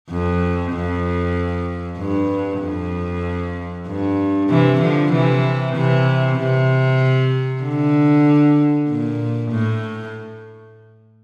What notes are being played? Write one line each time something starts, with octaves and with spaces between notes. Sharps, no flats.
F2
F2
G2
F2
G2
C3 E3
D3 F3
C3 E3
C3 E3
C3
D3
A#2
A2